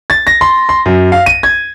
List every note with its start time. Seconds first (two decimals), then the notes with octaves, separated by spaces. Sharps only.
0.10 A6
0.27 A#6
0.41 C6
0.69 C6
0.86 F#2
1.12 F5
1.26 D#7
1.43 G#6